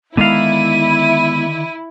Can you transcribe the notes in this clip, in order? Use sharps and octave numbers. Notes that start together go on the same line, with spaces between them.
D3 D#3 G#3 B3 E4 F5 D#7